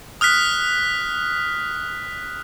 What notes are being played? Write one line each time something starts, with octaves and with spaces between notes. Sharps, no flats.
D#6 F6 F#6 B6